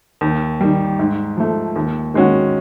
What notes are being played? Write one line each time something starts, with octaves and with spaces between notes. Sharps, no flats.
D#2
D#3 G3
G#2
F3 A3
D#2
D#3 G#3 C#4 F#4